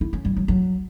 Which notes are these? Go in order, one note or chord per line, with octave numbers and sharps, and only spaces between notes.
E4
C#4
G3
F#3
F#3